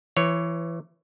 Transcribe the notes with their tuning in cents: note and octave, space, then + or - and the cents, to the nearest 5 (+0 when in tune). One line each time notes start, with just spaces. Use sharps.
E3 +25 C#5 +0